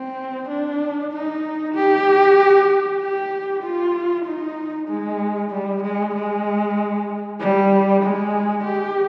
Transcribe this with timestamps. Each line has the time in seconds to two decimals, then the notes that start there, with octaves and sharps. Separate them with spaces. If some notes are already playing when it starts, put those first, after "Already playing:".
Already playing: C4
0.49 D4
1.12 D#4
1.75 G4
3.00 G4
3.63 F4
4.25 D#4
4.88 G#3
5.51 G3
5.83 G#3
6.15 G#3
7.40 G3
8.03 G#3
8.64 G4